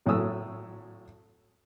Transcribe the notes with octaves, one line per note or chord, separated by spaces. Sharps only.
G#1 A2 F#3 A3 D#6 E6